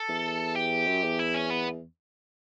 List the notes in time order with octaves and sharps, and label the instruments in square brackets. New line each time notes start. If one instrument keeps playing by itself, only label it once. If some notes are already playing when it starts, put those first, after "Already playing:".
Already playing: [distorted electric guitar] A4
[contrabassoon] E2
[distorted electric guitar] G4
[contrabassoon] F#2
E2
[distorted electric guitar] E4
C#4
B3